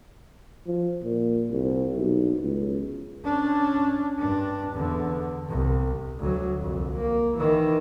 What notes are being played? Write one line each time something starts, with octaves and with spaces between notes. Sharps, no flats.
F3
A#2
C2
B1
C#2
C#4 D4
G2 D4
E2 D3
C2
D2 F#3
C2 F2
A#3
D#3 E3